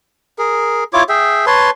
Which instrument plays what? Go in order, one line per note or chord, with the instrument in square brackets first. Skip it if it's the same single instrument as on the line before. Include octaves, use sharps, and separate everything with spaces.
[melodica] G#4 A#4
E4 F4 C#5 D6
G#4 E5 G5
B4 C#5 A5 C6